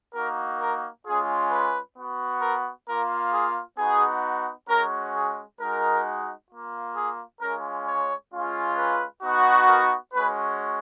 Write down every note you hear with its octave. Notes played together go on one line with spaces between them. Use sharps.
A#3 D#4 F#4 A#4
A#4
G#3 C#4 F4 G#4
B4
B3 F#4
A#4
A#3 F4 A#4
G#4
B3 D#4 F#4 G#4
G#3 C#4 F#4 A#4
G#4
G#3 D#4 F#4 A#4
A#3 F4
G#4
G#3 C#4 F4 A#4
C#5
G#3 C#4 F4
B4
B3 D#4 F#4
A#4
G#3 C#4 F#4 B4